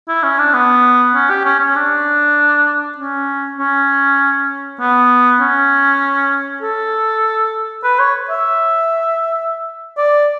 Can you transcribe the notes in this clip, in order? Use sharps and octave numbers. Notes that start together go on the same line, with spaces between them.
E4
C#4
D4
B3
C#4
G4
C#4
C#4
D4
C#4
C#4
B3
C#4
A4
B4
C#5
E5
D5